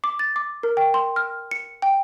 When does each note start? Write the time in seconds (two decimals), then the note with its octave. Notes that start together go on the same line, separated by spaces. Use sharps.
0.04 D6
0.19 A6
0.36 D6
0.63 A#4
0.77 G5
0.94 C6
1.16 F6
1.51 C#7
1.82 G5